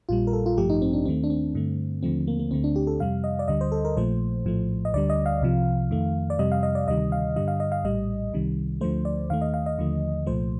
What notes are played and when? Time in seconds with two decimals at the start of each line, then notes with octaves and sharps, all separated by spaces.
0.09 A#1 A#2 G3 F4
0.27 A#4
0.33 A4
0.46 F4
0.57 A1 G2 F3 A3 G4
0.70 D#4
0.82 C4
0.93 D4
1.05 D#2 D#3 A3 C4
1.24 D4
1.30 C4
1.55 G2 D3 A3
2.03 D#2 D3 F3 A3 C4
2.27 A#3
2.39 A#3
2.51 D2 D3 A3 C4
2.64 D4
2.76 G4
2.87 A4
3.00 F2 C3 G3 F5
3.24 D#5
3.39 D5
3.48 D2 D3 G3 D#5
3.61 C5
3.72 A4
3.85 A#4
3.97 A#1 A#2 F3 A3 C5
4.45 A#1 A2 F3 A3
4.85 D#5
4.94 D2 D3 G3 D5
5.10 D#5
5.26 F5
5.41 C2 C3 F3
5.91 F2 D#3 A3
6.30 D5
6.39 F2 C3 G3 D#5
6.52 F5
6.63 D#5
6.75 D5
6.87 D2 C3 D#3 G3 D#5
7.12 F5
7.36 G2 D3 G3 D#5
7.48 F5
7.60 D#5
7.72 F5
7.84 A#1 A2 G3 D#5
8.33 C2 C3 D#3 G3
8.81 D2 D3 F3 A3 C5
9.05 D5
9.30 D#2 D#3 A3 F5
9.41 D#5
9.54 F5
9.66 D#5
9.78 D#2 D3 F3 A3
10.26 C2 A#2 F3 A3 C5